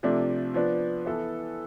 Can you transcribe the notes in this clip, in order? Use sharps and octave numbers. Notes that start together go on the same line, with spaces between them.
C3 F3 A3 D4
F3 B3 D4
E3 B3 E4 A4